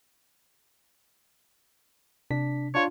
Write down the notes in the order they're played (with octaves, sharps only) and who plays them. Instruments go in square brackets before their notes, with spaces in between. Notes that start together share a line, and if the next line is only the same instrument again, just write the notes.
[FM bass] C3 [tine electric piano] D4 B6
[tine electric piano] D4 F4 [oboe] C#5